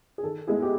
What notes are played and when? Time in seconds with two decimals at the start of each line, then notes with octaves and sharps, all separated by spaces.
0.18 G#4
0.23 D#3 A4
0.47 G#3 B3 E4 G#4
0.62 G4